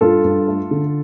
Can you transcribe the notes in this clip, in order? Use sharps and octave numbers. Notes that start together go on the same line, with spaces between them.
G2 F4 A4
G2
A3
D3